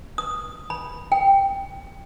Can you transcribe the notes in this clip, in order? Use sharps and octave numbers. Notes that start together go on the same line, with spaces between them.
D#6
B5
G5